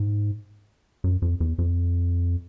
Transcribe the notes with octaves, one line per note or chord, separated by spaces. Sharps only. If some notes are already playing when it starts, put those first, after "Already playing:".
Already playing: G#2
F#2
F2
E2
F2